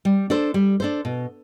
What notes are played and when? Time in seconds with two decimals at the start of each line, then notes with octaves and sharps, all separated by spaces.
0.05 G3
0.30 D4 A4 C5
0.54 G3
0.80 D4 A4 C5
1.05 B2